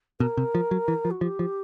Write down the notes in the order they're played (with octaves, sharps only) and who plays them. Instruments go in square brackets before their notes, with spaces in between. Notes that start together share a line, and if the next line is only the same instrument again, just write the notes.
[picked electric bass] B2 [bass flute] A#4
[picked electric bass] C3
F3
F#3
E3
F3
[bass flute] F#4
[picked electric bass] F3 [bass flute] G4
[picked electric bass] F3